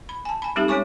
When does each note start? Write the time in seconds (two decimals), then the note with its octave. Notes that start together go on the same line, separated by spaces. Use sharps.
0.09 B5
0.25 G#5 A5
0.42 G#5 B5
0.56 G3 G#3 C4 D#4 G4 A4
0.68 G#3 C#4 C#5 G#5 C#6 D6